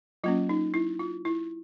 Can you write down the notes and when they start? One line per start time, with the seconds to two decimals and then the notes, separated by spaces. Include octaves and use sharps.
0.24 F#3 A#3 C#4 F4
0.49 D#4
0.74 E4
0.99 F4
1.25 E4